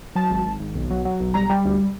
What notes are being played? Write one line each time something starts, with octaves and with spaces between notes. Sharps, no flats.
F#3 A5
G#1
G#1
G#1
B1
F#3
F#3
B1
G3 A#5
G3
D2